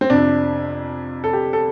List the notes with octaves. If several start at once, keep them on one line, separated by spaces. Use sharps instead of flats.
C4
F2 C3 D4
A4
G4
A4